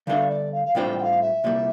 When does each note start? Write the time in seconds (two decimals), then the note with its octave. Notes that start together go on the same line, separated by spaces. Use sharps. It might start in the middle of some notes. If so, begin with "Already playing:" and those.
0.07 D3 G3 D4 A4 E5 F5
0.29 D5
0.52 F5
0.65 F5
0.75 A2 G3 D4 F4 C5 G5
0.98 G5
1.02 F5
1.21 E5
1.44 C2 A#2 G3